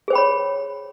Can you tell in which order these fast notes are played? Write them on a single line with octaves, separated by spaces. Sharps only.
G#4 C5 G5 B5 C#5